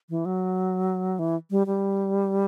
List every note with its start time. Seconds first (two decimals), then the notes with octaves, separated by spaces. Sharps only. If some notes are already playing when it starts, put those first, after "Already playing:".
0.09 E3
0.25 F#3
1.19 E3
1.50 G3
1.67 G3